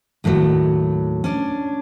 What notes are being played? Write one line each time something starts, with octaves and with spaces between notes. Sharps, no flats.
D#2 A2 F3 F#3
C#4 D4